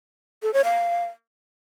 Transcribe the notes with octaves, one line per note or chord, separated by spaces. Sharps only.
A4
C#5
F5